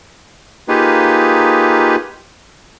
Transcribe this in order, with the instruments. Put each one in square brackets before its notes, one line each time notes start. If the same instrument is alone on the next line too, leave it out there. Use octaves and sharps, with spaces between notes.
[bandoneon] A#3 D#4 F4 G4 G#4 B4